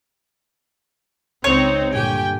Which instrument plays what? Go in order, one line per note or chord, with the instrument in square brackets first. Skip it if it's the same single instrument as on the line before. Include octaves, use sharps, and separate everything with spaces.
[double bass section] C#2 [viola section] C4 D#4 [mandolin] C#5
[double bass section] G2 A#2 D3 [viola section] G4 G5 G#5